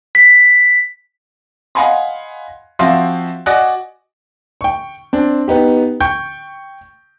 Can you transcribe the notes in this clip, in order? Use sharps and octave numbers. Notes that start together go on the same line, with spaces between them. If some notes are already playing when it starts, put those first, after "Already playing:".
B6
D#5 F5 F#5 G#5 B5 C6
F3 C4 F#4 E5 F5 C6
F#4 D5 D#5 F#5 G#5 F#6
G5 C#6
C4 D4
B3 D#4 G4
G5 C#6 G6